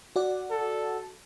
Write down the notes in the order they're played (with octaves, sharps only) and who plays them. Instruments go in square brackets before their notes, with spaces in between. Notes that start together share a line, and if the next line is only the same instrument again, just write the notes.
[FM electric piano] F#4 D5 F#5
[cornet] A4